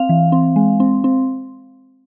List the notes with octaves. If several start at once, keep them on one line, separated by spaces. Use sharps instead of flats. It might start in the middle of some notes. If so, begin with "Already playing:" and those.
Already playing: C4 F5
E3
C4
G#3
C4
C4